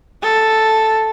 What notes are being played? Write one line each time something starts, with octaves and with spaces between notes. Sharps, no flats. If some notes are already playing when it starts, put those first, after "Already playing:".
A4